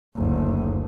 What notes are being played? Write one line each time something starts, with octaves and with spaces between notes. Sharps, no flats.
F#1 D2